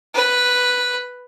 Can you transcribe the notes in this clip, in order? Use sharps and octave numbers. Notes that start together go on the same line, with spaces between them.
B4